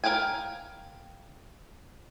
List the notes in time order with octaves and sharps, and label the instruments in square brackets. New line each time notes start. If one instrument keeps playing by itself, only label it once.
[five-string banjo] A#4 B4 F5 G5 G#5